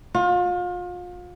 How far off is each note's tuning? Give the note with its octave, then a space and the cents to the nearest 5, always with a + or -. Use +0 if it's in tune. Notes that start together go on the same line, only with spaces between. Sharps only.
F4 +35